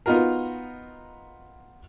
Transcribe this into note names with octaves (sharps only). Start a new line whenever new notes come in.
B3 D#4 F4 F#4 A#4